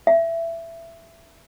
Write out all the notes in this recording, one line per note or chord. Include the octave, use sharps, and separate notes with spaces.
E5